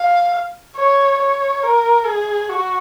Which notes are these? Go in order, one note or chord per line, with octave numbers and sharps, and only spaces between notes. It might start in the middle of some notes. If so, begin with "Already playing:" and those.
Already playing: F5
C#5
C#5
A#4
G#4
F#4